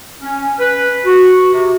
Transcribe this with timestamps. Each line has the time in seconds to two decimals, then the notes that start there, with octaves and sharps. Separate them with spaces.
0.22 C#4
0.59 B4
1.05 F#4
1.53 C3